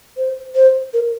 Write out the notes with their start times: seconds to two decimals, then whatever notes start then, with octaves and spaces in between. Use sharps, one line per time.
0.17 C5
0.55 C5
0.93 A#4